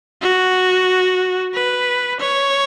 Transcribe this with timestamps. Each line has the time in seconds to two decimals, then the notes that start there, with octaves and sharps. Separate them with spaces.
0.22 F#4
1.54 B4
2.19 C#5